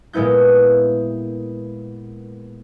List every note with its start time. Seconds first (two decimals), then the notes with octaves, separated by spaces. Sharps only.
0.13 A#2 G#3 B3 E4 G6